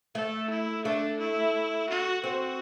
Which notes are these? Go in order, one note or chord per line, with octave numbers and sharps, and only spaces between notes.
A3 A4
E4
A3 D4
E4
F#4
C4 F#4